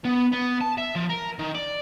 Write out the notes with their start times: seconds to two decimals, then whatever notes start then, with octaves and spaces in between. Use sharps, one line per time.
0.05 B3
0.32 B3
0.61 A5
0.78 E5
0.96 F3
1.09 A#4
1.39 D#3
1.55 D5